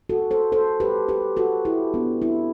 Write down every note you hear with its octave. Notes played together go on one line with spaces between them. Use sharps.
F#4 A4
A4 C5
A4 C5
G4 B4
G4 B4
F#4 A4
E4 G4
B3 D4
C4 E4